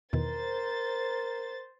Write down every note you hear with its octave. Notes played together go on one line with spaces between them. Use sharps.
E2 B2 D#3 A#4 C5 A6